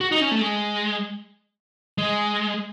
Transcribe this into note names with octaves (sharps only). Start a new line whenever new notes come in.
F#4
D#4
C#4
A3
G#3
G#3